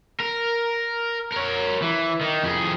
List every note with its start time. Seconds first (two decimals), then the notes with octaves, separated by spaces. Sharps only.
0.20 A#4
1.32 A#4 C#5
1.82 E3
2.21 D#3
2.44 F2 G#4